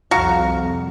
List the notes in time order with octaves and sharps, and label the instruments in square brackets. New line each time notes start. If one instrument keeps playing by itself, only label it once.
[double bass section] C2 F2 [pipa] F#4 F5 A#5